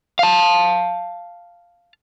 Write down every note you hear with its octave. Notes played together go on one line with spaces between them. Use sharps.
F5 A5